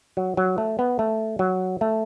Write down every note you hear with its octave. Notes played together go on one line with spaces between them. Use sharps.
F#3
F#3
A3
B3
A3
F#3
A3